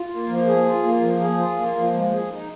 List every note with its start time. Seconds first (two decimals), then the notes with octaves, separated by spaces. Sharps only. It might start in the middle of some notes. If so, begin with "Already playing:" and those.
Already playing: F4
0.10 A#3
0.29 F3
0.47 G#4
0.66 F4
0.83 A#3
1.01 F3
1.21 G#4
1.39 F4
1.57 A#3
1.76 F3
1.94 G#3
2.12 G#4
2.31 D#4